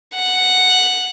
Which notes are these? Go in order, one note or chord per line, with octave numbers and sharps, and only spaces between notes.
F#5